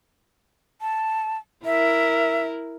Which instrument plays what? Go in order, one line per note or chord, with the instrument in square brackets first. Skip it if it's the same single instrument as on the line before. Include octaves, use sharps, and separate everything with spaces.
[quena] A5
[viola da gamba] E4 A#4 [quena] E5